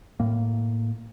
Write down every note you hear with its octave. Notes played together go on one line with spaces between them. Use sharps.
A2 A#3